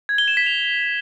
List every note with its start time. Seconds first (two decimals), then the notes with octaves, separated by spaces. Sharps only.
0.09 G#6
0.18 G7
0.28 E7
0.37 B6
0.46 F7